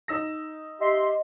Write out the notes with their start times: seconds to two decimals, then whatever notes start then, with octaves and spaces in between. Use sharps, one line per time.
0.08 D#4 E6 A#6
0.81 G4 D#5 E5 C6